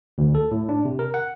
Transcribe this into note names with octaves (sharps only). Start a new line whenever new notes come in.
D2
A4
A2
D4
C3
A#4
F#5